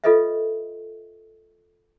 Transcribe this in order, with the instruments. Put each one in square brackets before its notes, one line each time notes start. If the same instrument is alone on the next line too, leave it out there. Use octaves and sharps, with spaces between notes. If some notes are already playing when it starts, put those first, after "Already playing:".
[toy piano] F4 A4 B4 D#5 E5